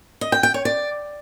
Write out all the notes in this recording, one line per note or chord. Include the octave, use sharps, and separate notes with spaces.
D#5
G5
G5
C#5
D5